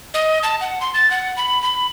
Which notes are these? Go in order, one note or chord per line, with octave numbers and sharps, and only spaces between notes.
D#5
A5
F#5
C6
A6
F#5
B5
B5